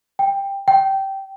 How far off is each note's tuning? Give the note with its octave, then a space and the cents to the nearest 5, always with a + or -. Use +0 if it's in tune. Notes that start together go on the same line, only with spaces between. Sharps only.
G5 +10
G5 -15